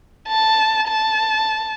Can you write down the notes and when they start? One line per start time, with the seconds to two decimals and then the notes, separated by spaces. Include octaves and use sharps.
0.28 A5
0.87 A5